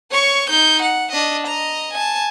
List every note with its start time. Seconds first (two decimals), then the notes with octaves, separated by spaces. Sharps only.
0.11 C#5 C#6
0.50 D#4 G6
0.82 F#5
1.12 D4 D#5
1.47 D#5 A#5
1.94 G#5 A5